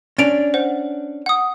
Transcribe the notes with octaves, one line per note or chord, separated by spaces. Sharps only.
C#4 D4 A6 D7 F7
C5 F#5
F#5 D#6